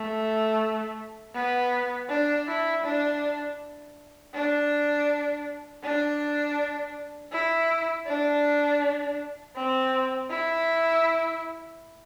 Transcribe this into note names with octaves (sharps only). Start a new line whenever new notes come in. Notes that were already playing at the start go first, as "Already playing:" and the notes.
Already playing: A3
B3
D4
E4
D4
D4
D4
E4
D4
C4
E4